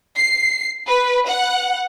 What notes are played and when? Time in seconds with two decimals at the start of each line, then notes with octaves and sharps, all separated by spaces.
0.17 C7
0.87 B4
1.27 F#5